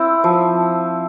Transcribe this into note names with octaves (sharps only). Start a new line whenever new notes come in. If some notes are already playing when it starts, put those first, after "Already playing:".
Already playing: C4 E4
F3